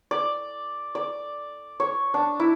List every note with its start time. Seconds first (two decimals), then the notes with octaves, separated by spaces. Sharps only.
0.11 D5
0.95 D5
1.80 C#5
2.14 D4
2.40 E4